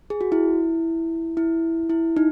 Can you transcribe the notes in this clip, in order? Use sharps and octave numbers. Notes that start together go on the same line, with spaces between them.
G#4
F#4
E4
E4
E4
D#4